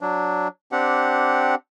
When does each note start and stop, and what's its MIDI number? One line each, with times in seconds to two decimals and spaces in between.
0.01 0.48 54
0.01 0.48 62
0.72 1.55 60
0.72 1.55 62
0.72 1.55 67
0.72 1.55 78